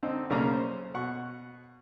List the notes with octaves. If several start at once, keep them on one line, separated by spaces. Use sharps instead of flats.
D3 C4 D#4 A4
B1 C#3 A#3 C#4 D5 A#5
C5
B2 F#5 C#6